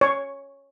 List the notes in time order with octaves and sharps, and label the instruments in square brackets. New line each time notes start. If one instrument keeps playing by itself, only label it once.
[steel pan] C#5